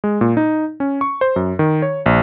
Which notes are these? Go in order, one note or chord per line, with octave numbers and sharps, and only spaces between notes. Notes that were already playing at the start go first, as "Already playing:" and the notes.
G#3
A#2
D#4
C#4
C#6
C5
F#2
D#3
C#5
A#1